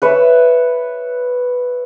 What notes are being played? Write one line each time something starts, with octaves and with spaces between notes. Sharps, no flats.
B4 C#5 E5